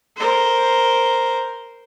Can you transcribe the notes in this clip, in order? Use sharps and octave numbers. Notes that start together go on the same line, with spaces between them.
A#4 C5